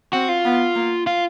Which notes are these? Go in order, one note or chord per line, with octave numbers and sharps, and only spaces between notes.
C4 F#4
F4
B3
A#3
F4